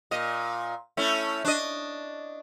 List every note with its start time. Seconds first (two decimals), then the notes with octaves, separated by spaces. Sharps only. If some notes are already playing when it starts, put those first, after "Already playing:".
0.11 A#2 D#5
0.97 A3 C#4 E4
1.45 D4 D#5